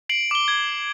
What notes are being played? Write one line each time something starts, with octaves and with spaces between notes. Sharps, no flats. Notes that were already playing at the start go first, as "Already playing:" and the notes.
C7 D7 F#7
D6 G7
G#6